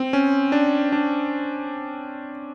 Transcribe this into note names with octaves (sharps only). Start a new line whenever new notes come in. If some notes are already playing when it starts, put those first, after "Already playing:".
Already playing: C4
C#4
D4
D4